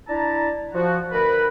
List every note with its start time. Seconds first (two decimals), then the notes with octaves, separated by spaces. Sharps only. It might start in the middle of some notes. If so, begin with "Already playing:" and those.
0.08 D4 E4 A5 A#5
0.74 F3 F#4
1.12 D2 A#4 B4 B5